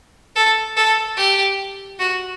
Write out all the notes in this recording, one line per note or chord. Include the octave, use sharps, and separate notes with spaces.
A4
A4
G4
F#4